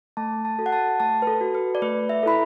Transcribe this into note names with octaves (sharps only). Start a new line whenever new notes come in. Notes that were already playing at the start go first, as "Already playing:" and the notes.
A3 A5
A5
F#4 A4
F#5
A5
A3 A5
B4
A4
F#4 A4
B4
D5
A3 B4
E5
E4 A4 B5